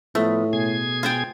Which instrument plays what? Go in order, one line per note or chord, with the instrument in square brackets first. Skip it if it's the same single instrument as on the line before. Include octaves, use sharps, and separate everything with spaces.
[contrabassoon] A2 [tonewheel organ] F3 B3 [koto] A3
[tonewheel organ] B2 G#4 G#6
[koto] F4 C5 G5